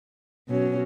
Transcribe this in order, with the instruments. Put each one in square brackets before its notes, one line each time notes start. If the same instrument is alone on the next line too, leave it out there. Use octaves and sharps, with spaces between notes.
[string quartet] B2 F#3 C#4